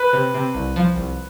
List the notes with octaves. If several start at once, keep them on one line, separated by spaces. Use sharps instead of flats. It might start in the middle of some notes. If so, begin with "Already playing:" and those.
Already playing: B4
C3
C3
C2
F3
C2